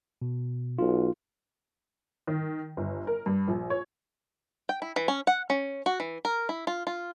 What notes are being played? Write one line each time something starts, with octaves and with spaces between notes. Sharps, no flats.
B2
B1 F4
D#3
G1
A#4
G2
A#1
C#5
G5
E4
E3
C#4
F#5
C#4
F#4
E3
A#4
E4
F4
F4